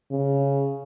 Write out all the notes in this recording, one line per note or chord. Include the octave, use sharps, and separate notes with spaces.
C#3